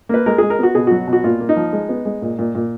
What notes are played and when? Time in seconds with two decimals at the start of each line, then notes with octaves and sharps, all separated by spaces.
0.09 A#3 B4
0.26 G#3 A#4
0.38 G#3 G#4
0.50 A#4
0.59 B3 F#4
0.75 B2 G#4
0.87 F#3 F#4
1.07 B2
1.13 F#4
1.24 A#2 F4
1.40 A#3
1.49 D#4
1.57 F3
1.73 G#3
1.89 B3
2.05 G#3
2.22 A#2
2.39 A#2
2.55 A#2